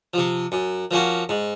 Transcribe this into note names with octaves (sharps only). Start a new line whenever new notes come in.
C3 F3
F#2
F3 A#3 C#4 F#4
G#2